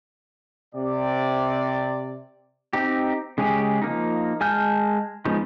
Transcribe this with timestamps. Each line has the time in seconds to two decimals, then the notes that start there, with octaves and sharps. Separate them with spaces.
0.75 C3 D5
2.73 C4 D#4 G4
3.38 C#3 G#3 C#4 G4 G#4
3.82 F3 A#3 D#4
4.41 G#3 G#5 A5 F6 G6
5.25 F3 G#3 B3 C#4 D#4